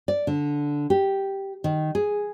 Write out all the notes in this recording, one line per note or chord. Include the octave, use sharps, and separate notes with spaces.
D5
D3
G4
D#3
G#4